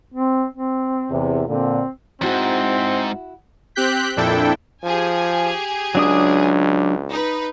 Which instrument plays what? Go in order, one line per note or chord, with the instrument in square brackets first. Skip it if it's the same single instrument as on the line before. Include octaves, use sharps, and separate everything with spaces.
[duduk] C4
C4
[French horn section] E2 C3
[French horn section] A#2 D3 [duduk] C4
[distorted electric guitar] E2 G#2 [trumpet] C4 [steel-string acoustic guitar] E4 F#4
[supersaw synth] C4 G4 F#6 G6 B6
F2 A#2 D4 E4 A4 G5
[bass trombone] F3 [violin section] G4 G#4 G#5
[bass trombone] C#2 [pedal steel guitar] F#3 D4 D#6
[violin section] D#4 B4